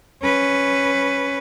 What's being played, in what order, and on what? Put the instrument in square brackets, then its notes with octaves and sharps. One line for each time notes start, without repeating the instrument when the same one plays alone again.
[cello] C#4 B4